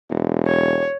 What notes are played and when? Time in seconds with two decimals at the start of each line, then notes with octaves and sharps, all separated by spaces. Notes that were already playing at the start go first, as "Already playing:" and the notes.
0.10 E1
0.47 C#5